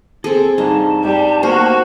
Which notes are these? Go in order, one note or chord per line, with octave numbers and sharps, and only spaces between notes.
C4 G#4 A4
G2 G3 D#4 D#5 A5
G2 G3
A#3 B3 F#4 A#4 C5